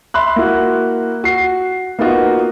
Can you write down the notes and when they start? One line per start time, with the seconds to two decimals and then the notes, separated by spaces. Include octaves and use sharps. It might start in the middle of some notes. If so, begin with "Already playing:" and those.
0.14 E5 B5 C6 F#6
0.36 A#3 E4 F#4
1.24 F#4 C7
1.99 A#3 B3 D#4 F4 F#4